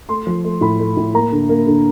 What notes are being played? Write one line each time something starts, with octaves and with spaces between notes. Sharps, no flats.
A3 C6
F3
A3
A2 B5
A3
A2
A#3 A#5
D3
A#3
D3